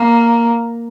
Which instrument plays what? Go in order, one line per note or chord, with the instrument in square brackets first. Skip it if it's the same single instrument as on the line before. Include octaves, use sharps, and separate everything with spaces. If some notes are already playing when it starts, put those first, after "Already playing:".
Already playing: [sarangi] A#3